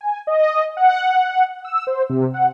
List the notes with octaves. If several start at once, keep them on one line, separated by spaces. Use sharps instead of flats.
G#5
D#5
F#5
E6
C5
C3
F#5